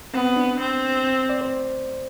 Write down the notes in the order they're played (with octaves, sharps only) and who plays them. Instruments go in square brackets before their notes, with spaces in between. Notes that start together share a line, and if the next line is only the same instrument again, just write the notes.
[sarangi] B3 [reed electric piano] C4
[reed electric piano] D4
[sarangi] C4
[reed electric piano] D5
C5